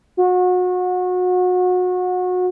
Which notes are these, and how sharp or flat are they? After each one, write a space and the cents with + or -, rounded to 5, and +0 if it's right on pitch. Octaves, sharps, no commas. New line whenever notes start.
F#4 -30